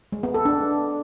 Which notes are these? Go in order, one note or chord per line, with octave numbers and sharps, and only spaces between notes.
G#3
B3
A4
D4